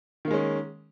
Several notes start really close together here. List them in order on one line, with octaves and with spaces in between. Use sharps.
D#3 A#3 G#3 C#4